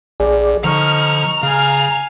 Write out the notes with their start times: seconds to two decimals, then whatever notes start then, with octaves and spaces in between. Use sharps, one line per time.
0.20 A#1 G#4 D5
0.64 D3 F3 D#4 A#5 C#6 F6
1.43 C#3 F5 G#5